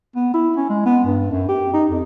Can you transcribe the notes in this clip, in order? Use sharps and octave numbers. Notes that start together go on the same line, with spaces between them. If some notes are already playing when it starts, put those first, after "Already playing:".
B3
E4
C#4
G#3
B3
G2
F#2
G4
D#4
F2